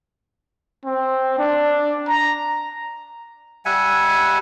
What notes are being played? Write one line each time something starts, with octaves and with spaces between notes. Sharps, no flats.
C4
D4
A#5
G3 E5 F#5 G#5